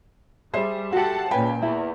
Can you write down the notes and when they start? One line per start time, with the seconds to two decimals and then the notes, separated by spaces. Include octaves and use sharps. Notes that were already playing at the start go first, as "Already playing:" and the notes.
0.54 G3 G#4 C5 E5
0.93 F#4 G4 A4 F#5 A5
1.31 C#2 A#2 B4 G5 G#5
1.62 E2 E4